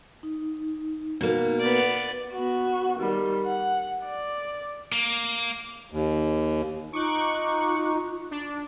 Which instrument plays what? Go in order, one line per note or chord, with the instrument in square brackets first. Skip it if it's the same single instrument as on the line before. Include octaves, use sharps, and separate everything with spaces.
[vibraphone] D#4
[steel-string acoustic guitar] B2 A#3
[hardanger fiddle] B3 D5
[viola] B3 F#4
D#3 G3
F#5
D5
[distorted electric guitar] A#3
[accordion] D#2
[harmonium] D#4 [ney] F4 [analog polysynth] C#6 D6 F#6
[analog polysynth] D4